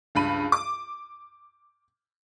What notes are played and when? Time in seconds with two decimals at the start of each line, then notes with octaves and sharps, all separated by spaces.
0.15 C#2 G2 B5 D#7
0.52 D6